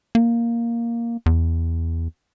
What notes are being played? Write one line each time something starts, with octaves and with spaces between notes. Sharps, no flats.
A#3
E2